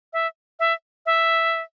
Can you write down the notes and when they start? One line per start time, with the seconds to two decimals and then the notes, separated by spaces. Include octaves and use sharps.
0.13 E5
0.59 E5
1.06 E5